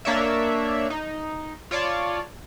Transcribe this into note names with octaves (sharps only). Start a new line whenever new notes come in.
A#3 D4 C#5 D5 E5
D#4
F4 C#5 D5 A5